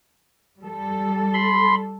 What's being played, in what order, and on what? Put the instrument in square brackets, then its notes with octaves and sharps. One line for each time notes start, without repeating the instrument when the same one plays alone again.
[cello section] G3 A4
[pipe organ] B5 C6